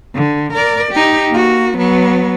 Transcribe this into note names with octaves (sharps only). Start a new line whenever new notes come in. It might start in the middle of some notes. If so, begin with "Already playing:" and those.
D3
A#4 D5
D#4 G4
A#3 F#4
F#3 B3